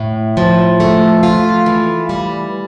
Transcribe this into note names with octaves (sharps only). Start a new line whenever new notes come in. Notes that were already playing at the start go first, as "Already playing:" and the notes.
Already playing: A2
F3
A3
F4
E3
G3